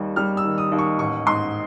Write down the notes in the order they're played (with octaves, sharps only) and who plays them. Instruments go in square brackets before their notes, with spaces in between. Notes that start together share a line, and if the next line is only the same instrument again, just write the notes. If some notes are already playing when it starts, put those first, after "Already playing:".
Already playing: [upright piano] D#2 D#3 G3
G3 F6
E6
D#3
D#6
D#2
C#6
A1 C#6
G#2 C6